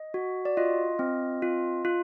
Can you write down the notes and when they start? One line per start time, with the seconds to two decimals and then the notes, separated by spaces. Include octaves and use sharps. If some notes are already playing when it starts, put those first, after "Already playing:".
Already playing: D#5
0.14 F#4
0.45 D5
0.57 F4 D#5
0.99 C4
1.42 F4
1.85 F4